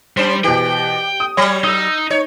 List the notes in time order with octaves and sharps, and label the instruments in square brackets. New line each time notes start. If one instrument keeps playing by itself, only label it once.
[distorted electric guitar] G3 [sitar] C#4 C5
[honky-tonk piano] B2 E3 [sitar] G4 [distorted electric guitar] G5
[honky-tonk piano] D#6
[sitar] F#3 G3 [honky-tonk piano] C#5
[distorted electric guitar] D#4 [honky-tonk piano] D#6 E6
[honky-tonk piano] D#4 [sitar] C#5